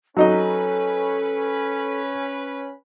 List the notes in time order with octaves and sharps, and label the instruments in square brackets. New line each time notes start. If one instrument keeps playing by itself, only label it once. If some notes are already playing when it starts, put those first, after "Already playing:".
[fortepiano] F#3 D#4 D#5 [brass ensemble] C#4 B4 [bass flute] A4